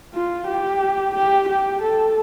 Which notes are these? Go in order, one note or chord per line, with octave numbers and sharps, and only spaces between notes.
F4
G4
G4
G4
A4